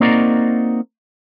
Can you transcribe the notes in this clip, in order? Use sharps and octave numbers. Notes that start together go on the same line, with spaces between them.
A#3 C4 D#4 F#4 A#4 D5